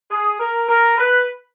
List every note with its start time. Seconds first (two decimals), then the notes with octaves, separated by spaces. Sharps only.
0.11 G#4
0.40 A#4
0.69 A#4
0.97 B4